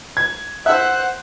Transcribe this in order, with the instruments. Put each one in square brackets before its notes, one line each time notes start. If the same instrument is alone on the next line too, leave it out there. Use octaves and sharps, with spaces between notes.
[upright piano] G#6
[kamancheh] C5 F#5 [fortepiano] E5 E6 [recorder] F#6